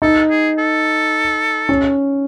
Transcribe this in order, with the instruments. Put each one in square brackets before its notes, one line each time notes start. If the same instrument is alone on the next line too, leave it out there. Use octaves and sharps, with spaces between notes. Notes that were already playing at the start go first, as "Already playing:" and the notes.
[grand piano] D#4 [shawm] A4
[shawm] G#4
A4
[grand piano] C#4